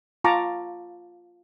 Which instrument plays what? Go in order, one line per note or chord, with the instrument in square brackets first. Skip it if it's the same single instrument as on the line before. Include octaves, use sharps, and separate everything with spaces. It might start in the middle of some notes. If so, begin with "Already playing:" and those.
[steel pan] F4 A5 A#5 C#6 D6